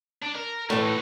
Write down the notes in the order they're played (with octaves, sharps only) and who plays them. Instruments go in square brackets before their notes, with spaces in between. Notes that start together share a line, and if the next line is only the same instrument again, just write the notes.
[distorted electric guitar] D4
A#4
[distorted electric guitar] D#2 A3 [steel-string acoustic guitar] A2 E3 [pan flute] C#6
[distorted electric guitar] D#4 F#4